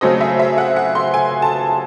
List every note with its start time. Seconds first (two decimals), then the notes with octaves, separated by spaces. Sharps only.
0.01 C#3 F#3 A3 C4 D#5
0.21 E5
0.39 E5
0.58 F#5
0.76 F#5
0.95 C6
1.14 G#5
1.42 A5